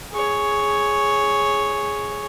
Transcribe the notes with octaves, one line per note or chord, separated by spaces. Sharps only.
G#4 C#5